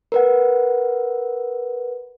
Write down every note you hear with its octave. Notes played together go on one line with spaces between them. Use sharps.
A#4 B4 F#5